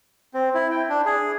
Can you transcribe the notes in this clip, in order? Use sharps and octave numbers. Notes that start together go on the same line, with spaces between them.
C4
E4
G5
D4
G#4